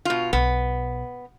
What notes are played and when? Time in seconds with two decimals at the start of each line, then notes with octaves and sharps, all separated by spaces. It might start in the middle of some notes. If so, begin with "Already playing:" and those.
0.05 B2 F4
0.33 B1 B3